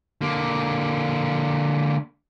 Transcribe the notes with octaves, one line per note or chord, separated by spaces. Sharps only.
D3 A#3